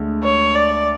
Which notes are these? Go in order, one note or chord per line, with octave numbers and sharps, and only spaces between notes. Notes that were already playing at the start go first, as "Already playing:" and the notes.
Already playing: D2 D3 G#3 D4
C#5
D5